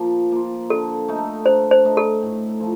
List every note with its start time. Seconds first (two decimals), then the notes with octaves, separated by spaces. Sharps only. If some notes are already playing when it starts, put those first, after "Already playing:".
Already playing: F3 A#3 F4
0.32 A#3 F4
0.70 D3 A4
1.08 A3 D#4
1.46 D3 C5
1.71 C5
1.84 A3 D#4
1.97 A4
2.23 A2
2.60 F3